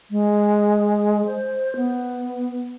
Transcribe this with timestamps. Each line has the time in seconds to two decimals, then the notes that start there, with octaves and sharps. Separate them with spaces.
0.11 G#3
1.27 C5
1.76 B3